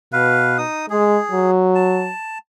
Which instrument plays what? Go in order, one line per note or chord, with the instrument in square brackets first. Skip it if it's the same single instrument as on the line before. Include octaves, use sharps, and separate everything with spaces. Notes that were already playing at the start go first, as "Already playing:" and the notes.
[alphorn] B2 [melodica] B4 F5
[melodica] D#4 D#6
[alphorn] G#3 [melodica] G#4
[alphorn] F#3
[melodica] A5